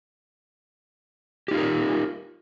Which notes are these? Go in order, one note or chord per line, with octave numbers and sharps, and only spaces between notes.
D#4 F4 G4 A#4